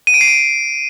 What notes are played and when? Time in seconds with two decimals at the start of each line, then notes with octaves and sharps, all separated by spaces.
0.07 D#7
0.14 D7
0.21 C7
0.28 D7